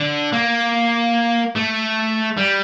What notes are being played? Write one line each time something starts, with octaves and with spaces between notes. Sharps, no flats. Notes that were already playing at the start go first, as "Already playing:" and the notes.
Already playing: D3
A#3
A3
G3